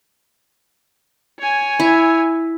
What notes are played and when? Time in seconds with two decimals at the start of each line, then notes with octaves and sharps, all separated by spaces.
1.40 C#5 G#5
1.80 E4